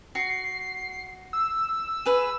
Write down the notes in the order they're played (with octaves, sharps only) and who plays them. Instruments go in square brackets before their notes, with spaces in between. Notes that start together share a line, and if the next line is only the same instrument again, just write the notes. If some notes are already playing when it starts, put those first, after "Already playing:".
[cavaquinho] F#4 [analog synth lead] C7
[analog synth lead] E6
[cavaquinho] G#4 B4